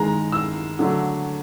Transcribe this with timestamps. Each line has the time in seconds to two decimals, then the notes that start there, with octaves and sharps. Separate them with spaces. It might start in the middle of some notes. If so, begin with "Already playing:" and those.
Already playing: D#3 G#3 A#5
0.32 E6
0.79 D3 F#3 A3